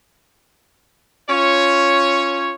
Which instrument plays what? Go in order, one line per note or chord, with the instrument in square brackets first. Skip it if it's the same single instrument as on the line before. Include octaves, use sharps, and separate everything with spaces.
[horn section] C#4 F4 C#5